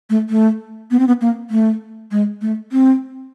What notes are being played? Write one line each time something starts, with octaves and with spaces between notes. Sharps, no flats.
A3
A3
B3
C4
B3
A#3
A3
G#3
A3
C4